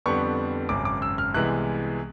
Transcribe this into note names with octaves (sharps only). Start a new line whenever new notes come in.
F2 D3 G3 B3 C#6
G#1 F#2 C#3 D6
D6
E6
F6
C2 C3 E3 G#3 B3 F#6